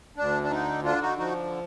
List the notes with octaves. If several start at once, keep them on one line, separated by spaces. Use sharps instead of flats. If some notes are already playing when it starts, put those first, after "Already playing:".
D2 D4
D4
D3 D#4
D3 D4 F4
D#4 F#4
F3 D#4 F#4